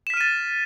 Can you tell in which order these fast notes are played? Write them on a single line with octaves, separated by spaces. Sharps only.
E7 B6 F6 D#7 A6